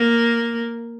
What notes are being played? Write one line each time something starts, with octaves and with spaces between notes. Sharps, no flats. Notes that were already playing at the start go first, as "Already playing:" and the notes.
Already playing: A#3